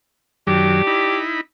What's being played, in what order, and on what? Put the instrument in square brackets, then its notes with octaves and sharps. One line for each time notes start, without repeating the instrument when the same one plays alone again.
[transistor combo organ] F#2 D#3 F#3 [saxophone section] D4 G4
[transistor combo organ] D#4 E4 B5